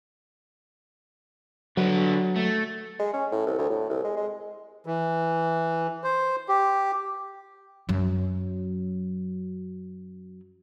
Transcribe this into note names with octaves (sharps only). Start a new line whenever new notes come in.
D3 F#3 B4
A3
G#3
C#4
A2
C2
D2
A2
C2
G#3
G#3
E3
C5
G4
F#2 F#3